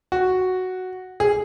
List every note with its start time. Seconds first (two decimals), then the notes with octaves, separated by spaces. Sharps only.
0.12 F#4
1.20 G#4